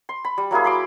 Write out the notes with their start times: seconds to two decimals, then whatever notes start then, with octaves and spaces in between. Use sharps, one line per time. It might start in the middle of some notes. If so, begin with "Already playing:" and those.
0.09 C6
0.25 B5
0.38 G3
0.51 F#3 A#3 E4 G#4
0.64 B5 C6 D6